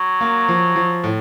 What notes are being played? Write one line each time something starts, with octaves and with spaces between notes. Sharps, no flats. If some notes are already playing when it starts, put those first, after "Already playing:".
Already playing: F#3
A#3
F3
F3
A2